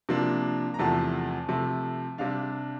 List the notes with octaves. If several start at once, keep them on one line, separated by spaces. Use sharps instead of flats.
C3 F3 A#3 D4
A#5
E2 C3 F3 A3 A5
C3 F3 A3
C3 G3 D4 F5